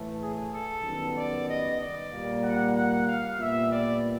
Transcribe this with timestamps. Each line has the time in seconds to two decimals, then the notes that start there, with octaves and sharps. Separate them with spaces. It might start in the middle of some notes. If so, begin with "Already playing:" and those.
Already playing: A2 E3 A3
0.20 G#4
0.52 A4
0.83 F#2 D#3 G3 B3
1.16 D5
1.47 D#5
1.79 D5
2.11 A#2 G3 A#3
2.42 F#5
2.75 F#5
3.07 F5
3.39 A#2 G3 B3 E5
3.70 D5